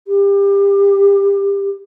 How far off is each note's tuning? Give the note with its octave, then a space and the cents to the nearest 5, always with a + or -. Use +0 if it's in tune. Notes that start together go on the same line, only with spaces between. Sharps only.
G4 +25